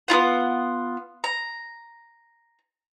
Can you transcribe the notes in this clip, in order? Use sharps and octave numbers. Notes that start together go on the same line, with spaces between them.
B3 E4 F4 F#5
A#5